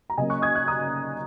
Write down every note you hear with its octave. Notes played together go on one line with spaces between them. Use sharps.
A#5
C#3 F#3 A#3 C#4 D#5 G#5
C#6 F#6
D#6 G#6
C#6 F#6
A#5 D#6